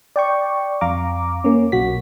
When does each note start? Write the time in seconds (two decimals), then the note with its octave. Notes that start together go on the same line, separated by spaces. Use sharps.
0.16 D5 G5 C#6
0.81 F2 F5 A#5 D6
1.44 A#3 C#4
1.72 B1 F#4 B6